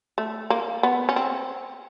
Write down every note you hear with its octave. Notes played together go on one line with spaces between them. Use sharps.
A3
A#3
B3
C#4
C4